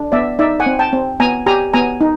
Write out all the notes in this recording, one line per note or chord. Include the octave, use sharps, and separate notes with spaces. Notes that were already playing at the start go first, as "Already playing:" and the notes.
Already playing: D4
B3 D5 E5
D#4 D5 E5
F#5 G#5
C4
G5 A5
C4
B3 G#5 A#5
G4 G#5 A#5
B3 G#5 A#5
D#4